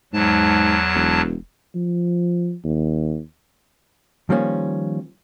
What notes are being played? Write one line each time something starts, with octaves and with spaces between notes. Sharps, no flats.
E2 G#2 F#3 A5
E1
F3
D#2
D#3 F3 G3 A#3 C#4